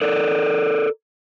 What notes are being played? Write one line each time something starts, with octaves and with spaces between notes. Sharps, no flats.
A4 A#4 D5